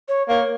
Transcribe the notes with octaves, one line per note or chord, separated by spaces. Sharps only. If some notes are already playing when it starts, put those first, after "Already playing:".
C#5
A#3 C#5